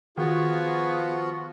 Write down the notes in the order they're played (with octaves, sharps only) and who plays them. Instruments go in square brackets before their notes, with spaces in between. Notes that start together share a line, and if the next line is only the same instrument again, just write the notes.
[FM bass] D#3 [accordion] F3 F4 F#4 [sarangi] B3 [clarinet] G#4